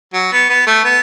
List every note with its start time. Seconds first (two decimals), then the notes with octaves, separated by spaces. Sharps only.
0.13 F#3
0.32 B3
0.49 B3
0.67 A3
0.84 B3